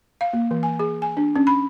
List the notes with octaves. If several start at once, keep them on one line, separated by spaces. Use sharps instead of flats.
F5
A#3
E3
G#5
G#4
G#5
D4
C#4
B5